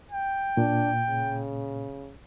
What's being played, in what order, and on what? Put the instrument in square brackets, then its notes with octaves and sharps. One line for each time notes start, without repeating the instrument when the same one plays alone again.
[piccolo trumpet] G5
[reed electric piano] A#2 [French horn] D4
[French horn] C#3